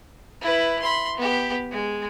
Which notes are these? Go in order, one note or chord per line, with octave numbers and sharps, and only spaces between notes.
E4 B4
B5 C6
B3 G4
G#3